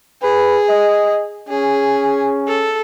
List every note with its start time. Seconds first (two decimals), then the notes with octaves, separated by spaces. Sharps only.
0.23 G#4 B4
0.69 D#5
1.49 C#4 G#4
2.48 A4